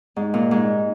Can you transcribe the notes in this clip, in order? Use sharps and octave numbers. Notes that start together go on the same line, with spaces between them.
G#2
A#2
G#2